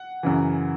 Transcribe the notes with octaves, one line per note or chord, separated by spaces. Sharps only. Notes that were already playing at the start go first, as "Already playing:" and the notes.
Already playing: F#5
F#2 C#3 E3